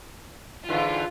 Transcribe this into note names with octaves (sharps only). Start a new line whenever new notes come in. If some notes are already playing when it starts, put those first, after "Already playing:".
G#2 D3 E3 F4